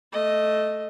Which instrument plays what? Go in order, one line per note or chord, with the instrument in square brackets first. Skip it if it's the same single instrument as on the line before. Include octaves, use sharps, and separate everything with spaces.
[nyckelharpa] A3 D#5